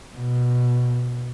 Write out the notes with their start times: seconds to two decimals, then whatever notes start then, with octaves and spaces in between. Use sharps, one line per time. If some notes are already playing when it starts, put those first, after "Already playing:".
0.16 B2